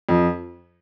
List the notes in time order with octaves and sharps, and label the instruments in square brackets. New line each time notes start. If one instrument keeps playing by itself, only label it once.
[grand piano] F2